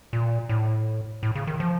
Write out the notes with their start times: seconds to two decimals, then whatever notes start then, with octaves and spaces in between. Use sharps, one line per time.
0.13 A#2
0.49 A2
1.23 A2
1.35 C#3
1.47 D#3
1.60 F3